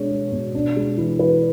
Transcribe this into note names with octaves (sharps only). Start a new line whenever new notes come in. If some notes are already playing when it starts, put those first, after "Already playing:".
Already playing: B2 G#3 B3 D4 C#5
G#3
B2
D4
G#3
E3
E3 B4